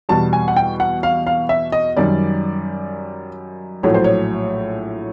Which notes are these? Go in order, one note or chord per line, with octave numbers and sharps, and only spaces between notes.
E2 B2 G3 A5
G#5
F#5
G5
F#5
F5
F5
E5
D#5
F#2 D#3 G3 D5
A#1 A2 F#3 A3 C#5
C5
C#5